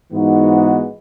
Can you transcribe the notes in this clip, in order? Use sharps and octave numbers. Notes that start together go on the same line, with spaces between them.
G#2 E3 G#3 B3 D#4 F#4